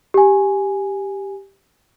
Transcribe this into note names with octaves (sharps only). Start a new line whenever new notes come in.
G4 G#5